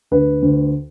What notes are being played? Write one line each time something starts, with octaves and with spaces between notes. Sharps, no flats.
D2 B4
D2